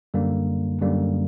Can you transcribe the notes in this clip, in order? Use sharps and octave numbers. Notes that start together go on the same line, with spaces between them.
F#2 D3 G3 A#3
F#2 D3 G3 A#3